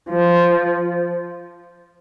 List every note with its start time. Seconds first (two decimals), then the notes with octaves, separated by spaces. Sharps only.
0.10 F3